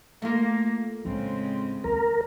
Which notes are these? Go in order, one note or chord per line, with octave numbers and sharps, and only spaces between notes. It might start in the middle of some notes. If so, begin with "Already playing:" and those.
A3 A#3 F4
D2 A2 C#3 G#3 C4
D#2 A#4